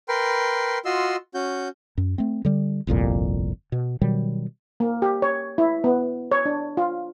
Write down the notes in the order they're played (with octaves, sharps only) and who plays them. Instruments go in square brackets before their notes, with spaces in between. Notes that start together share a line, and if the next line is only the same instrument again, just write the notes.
[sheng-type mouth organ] A#4 B4 G5 C6
F4 F#4 D#5 C6 E6
C#4 F#4 G6
[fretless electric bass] F#2
A3 C4
D3 G3
G1 C2 F2 A#2
B2
B2 D#3 F#3 G3
[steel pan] A#3
G4
C#5
E4
B3
C#5
D4
F4